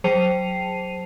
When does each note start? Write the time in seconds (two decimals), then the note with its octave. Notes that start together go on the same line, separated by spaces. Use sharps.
0.04 F#3 C5 A5 C7 D#7 F7